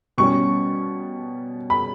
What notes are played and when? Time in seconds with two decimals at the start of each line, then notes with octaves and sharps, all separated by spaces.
0.18 B2 G3 C#4 C#6
1.70 B5